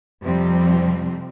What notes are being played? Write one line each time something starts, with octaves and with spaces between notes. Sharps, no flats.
F2 C3 F3 G3 C4